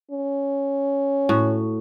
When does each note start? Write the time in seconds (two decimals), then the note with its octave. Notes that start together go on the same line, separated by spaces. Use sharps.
0.11 C#4
1.29 A2 F#4